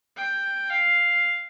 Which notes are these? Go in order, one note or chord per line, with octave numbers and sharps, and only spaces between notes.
G5
F5